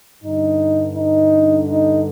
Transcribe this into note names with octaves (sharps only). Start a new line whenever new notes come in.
G2 D3 D#4
D#4
D#4